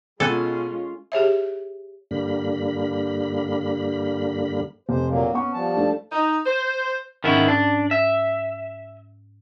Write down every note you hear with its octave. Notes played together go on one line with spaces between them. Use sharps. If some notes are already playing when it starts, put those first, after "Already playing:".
B2 G#3 C#4 F4 A4 G#5 F#6
G4 G#4 C#5 E5
G2 D3 G3 A#3 B5
F1 C5
A#2 F#3 A#3
B3 C#4 C#6
F3 G3 A5
A3 D4
D#4
C5
G#2 D#3 B3 C#4 E4
D4
E5